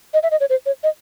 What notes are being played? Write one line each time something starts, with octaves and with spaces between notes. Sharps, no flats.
D#5
E5
D#5
C#5
C5
C#5
D#5